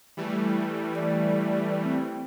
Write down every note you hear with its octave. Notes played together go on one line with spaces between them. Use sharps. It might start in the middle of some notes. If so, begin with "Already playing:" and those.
E3 G3 A3
D5
C4